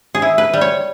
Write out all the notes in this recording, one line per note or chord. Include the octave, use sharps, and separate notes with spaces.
G#4
E4
B4
G3
C#5